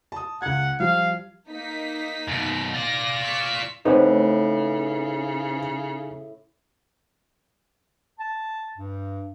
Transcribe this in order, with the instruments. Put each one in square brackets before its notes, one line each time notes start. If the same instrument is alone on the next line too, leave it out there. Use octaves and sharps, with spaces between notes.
[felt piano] A5 D#6
[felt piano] C#2 G#6 [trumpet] F#5
[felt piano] F3 G3 [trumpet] F5
[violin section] A#3 D#4 B6
[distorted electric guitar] F#2 B2
[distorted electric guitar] F4 D5 [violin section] A#6
[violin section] C#6 E6 B6
[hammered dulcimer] A2 [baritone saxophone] C#3 [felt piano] C4 B4 C5 [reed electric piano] D#4 G#4 F#5
[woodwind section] A5
G2